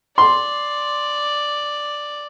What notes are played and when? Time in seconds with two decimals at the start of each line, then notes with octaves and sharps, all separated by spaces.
0.18 D5 C6